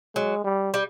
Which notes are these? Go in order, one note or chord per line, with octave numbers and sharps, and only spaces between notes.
F#3 G#3
G3
G3